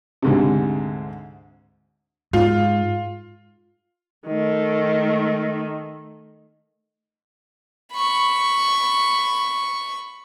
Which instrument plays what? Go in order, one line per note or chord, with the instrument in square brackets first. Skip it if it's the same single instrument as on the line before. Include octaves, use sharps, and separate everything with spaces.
[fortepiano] D2 G#2 C3
[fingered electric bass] G#2 [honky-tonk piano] F4
[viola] D#3 A3
[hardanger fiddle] B5 C#6